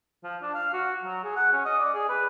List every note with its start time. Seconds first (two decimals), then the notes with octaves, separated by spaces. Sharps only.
0.24 F3
0.42 D4
0.54 F5
0.73 F#4
1.03 F#3
1.24 G#4
1.36 F#5
1.52 C#4
1.65 D#5
1.79 D5
1.94 G#4
2.09 B4